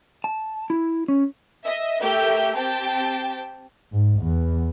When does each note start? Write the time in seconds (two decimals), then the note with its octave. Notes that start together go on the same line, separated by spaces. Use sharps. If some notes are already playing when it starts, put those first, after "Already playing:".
0.24 A5
0.70 E4
1.08 C#4
1.64 D#5 E5
2.00 A3 G4 A#4 E5 G6
2.56 C4 G4 G5 A5
3.93 G#2
4.21 E2